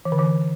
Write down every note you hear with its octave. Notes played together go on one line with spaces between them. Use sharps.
E3
D3
E3